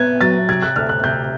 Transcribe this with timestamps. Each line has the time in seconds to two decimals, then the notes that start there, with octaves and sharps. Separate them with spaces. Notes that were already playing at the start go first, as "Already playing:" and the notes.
Already playing: B3 F#6 G#6
0.21 F#3 A6
0.49 C3 G#6
0.62 F#6
0.76 D2 F6
0.89 F#6
1.04 C3 G6